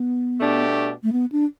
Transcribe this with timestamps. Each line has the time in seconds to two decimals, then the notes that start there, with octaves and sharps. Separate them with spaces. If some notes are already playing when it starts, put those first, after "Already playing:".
Already playing: B3
0.39 B2 A3 D4 G4
1.03 A3
1.13 B3
1.32 D4